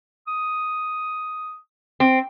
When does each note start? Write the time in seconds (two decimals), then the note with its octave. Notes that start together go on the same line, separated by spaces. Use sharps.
0.27 D#6
2.00 C4